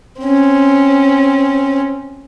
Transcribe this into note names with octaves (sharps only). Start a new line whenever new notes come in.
C4 C#4